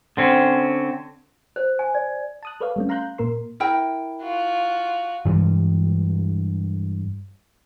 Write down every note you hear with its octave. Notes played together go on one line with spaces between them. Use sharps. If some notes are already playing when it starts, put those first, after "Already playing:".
D3 C4 C#4
C5
G#5
D5
A5 D#6 F#6
A4 B4 C#5 D5 F5
G3 A3 C#4
F5 A#5 C6 F#6 G6
A#2 A#3 A#4 C6
E4 A#4 G5
F4 F#4
G2 E3 G3 G#3